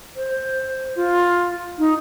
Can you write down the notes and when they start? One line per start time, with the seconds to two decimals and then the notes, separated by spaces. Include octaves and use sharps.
0.16 C5
0.96 F4
1.78 D#4